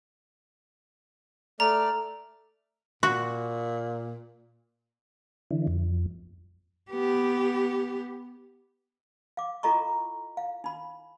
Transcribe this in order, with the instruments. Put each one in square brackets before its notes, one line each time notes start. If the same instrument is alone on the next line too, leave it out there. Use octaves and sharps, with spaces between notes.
[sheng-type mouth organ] A3 D5 F6 [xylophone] A#5
[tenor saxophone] A#2 [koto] F#4
[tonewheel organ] D3 E3
F2
[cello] B3 G4
[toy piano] F5 D6
E4 F4 A4 D#5 A#5 C#6
F5
D#4 B5